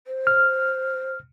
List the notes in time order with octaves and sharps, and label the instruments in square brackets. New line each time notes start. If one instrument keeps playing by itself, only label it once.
[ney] C5
[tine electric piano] F6